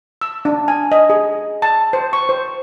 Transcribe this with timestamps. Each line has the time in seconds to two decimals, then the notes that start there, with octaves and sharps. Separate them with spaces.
0.21 E6
0.45 D4
0.68 G#5
0.92 D#5
1.10 G#4
1.62 A5
1.93 C5
2.13 C#6
2.29 C5